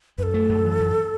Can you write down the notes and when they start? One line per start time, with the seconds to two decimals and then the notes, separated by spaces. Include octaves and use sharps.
0.18 F#2 A4 B4
0.34 A3
0.49 F#2
0.65 E3
0.80 F#2